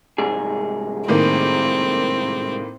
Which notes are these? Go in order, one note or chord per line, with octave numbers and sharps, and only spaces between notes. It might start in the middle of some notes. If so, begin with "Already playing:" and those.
C2 G#2 G#4
A2 D#3 A#3 C4